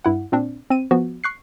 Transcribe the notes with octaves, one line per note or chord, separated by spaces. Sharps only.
G2 E4 F#5
A#2 C4 D4
C4 D#7
F3 B3 F#4
C#6 F#6 C7